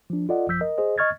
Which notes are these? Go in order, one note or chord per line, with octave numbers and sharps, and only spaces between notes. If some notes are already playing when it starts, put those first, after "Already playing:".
F3 D4
F4 A4 D5 D#5 F#5
A1 F#2 F3 E6 G6 B6
A#4 D#5
G#4 C5 D#5
D#5 C#6 F6 G#6 A6